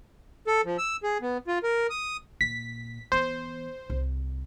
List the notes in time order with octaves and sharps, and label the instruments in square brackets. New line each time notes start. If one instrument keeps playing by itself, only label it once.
[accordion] A4
F3
E6
G#4
B3
F4
A#4
D#6
[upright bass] A#2 [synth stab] B6
[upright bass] E3 B3 [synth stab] C5
[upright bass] C2